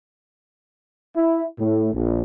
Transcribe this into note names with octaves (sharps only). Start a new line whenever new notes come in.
E4
A2
A#1